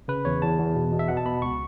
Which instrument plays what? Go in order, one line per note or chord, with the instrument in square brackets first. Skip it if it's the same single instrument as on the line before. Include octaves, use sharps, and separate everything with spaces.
[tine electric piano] C#3 B4
E2 C#5
E2 A5
E2
B2
B2
E5
B2 F#5
A5
B2 B5
C#2 C#6